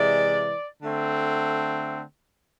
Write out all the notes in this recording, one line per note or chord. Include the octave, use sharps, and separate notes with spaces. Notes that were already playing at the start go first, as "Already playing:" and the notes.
Already playing: C3 E3 G#3 D5
D3 A3 C4